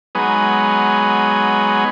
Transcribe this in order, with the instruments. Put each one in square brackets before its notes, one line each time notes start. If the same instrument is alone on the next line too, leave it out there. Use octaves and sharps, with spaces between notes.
[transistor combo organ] F#3 G#3 B3 D#4 B4 G#5